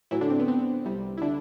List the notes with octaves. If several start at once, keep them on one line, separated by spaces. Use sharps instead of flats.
A2 E3 F#3 E4
D3 D4
C4
B3
C4
C2 C3 G3
E4
D3 D4